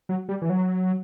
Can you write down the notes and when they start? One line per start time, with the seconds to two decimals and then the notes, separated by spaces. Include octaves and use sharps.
0.09 F#3
0.29 G3
0.42 E3
0.50 F#3